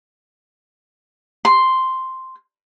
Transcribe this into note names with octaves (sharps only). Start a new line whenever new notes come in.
C6